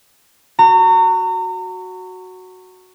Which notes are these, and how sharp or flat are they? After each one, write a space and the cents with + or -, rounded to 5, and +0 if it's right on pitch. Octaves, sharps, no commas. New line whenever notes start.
F#4 +0 A#5 -35